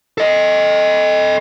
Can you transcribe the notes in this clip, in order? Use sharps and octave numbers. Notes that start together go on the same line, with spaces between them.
A4 D#5